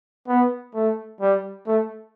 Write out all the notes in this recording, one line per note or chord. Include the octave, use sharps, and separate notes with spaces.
B3
A3
G3
A3